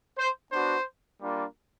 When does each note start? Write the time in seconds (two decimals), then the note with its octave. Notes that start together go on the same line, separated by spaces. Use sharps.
0.18 C5
0.52 B3 D4 F#4 C5
1.21 G3 A#3 D4 F4